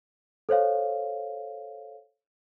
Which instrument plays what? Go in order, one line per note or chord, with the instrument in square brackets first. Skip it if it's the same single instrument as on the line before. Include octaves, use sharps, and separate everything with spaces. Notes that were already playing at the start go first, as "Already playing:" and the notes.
[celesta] A4 C5 C#5 F5